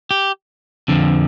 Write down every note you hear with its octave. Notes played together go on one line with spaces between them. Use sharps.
G4
F2 D3 F3